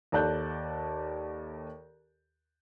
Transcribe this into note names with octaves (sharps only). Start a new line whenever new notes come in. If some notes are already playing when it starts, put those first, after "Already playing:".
D#2 A4 D5 A5 F#6 G6